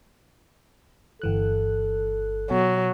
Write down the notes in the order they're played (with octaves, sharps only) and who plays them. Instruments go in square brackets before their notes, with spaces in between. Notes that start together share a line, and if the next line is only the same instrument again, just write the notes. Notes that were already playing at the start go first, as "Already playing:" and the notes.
[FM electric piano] G1 E3 F#6 [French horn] A4
[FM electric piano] B2 [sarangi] F#3